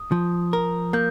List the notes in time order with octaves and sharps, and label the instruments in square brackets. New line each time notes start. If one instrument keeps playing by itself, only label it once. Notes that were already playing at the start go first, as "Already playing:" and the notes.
Already playing: [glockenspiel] D#6
[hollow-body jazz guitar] F3
A#4
[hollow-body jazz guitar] A#3 [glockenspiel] G6